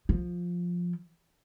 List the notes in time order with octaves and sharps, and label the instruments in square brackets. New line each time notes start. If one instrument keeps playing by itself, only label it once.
[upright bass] F3